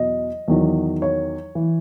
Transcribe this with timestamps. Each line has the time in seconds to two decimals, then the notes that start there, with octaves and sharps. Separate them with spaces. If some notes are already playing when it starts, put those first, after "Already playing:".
Already playing: E2 B2 F#3 D#5
0.48 E2 D#3 F#3
1.02 C#5
1.55 E3